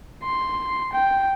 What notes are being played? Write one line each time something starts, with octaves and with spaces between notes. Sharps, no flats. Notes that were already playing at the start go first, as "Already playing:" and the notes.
C6
G5